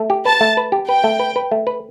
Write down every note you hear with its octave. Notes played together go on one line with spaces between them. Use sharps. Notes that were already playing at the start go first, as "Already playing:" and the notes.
Already playing: A3
G4
B4 A5
A3
B4
G4
B4 G5
A3
B4
B4
A3
B4